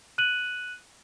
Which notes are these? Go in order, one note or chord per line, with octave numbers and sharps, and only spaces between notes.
F#6 D#7 F#7